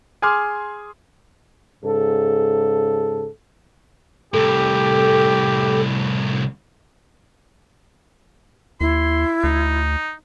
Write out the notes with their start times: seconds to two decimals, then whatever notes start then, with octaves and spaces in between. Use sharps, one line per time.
0.22 G#4 G#5 C6 D6 F6
1.84 G#2 C#3 A4
4.34 C2 A2 G4 A4
8.81 D#2 E4 C6
9.44 D2 D#4